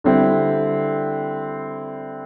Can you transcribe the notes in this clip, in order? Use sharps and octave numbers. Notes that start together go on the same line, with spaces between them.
D3 G3 C4 E4